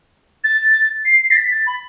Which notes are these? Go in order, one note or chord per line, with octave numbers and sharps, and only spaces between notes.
A6
C7
C7
A6
B6
A6
B5